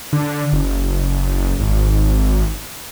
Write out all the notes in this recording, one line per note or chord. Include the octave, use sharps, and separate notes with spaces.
D3
F#1
G#1